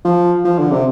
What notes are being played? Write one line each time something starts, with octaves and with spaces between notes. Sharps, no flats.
F3
F3
D3
C3